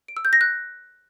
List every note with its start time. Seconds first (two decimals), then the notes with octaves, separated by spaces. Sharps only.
0.08 D7
0.17 E6
0.25 G6
0.33 A#6
0.41 F#6